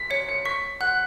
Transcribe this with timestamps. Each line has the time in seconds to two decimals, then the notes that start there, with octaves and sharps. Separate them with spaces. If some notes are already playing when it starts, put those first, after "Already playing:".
Already playing: B6
0.10 C#5 C#7
0.29 C#7
0.45 C#6 B6
0.81 F#5 F#6